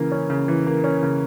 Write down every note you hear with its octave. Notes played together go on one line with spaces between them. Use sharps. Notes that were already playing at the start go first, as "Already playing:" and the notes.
Already playing: C#3 E3 A#3
C#4
C#3
E3
A#3
C#4
C#3